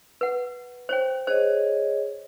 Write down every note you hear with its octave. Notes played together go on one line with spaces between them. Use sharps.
B4 F#5
C5 C#5 G5
G#4 C5 C#5 D#5